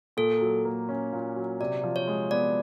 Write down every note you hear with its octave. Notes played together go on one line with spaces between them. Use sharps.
A#2 A4
F#3
A#3
C#4
A#2
F#3
C3 D5
F3
C#5
G#3
B3 D5